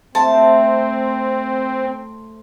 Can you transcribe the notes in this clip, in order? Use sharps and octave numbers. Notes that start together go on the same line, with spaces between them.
A3 C4 C5 A5